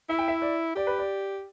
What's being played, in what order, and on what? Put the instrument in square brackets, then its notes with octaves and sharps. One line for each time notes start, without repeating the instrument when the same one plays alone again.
[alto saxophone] E4 [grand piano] E5
[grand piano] G5
E5
D5
[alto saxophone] G4 [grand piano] D5
[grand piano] B4
D5